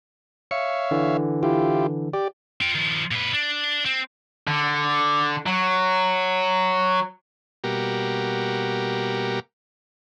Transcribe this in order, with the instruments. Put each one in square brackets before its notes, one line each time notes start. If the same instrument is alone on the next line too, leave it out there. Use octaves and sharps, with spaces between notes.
[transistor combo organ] C#5 E5 F5 [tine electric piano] C#7
[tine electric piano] D3 E3
[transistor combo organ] E4 F4 G4
G4 D5
[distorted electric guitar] F4 G5
D#3 F3
A#2 B4
D4
C4
D3
F#3
[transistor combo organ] B2 G3 A#3 F#4 G4 A#4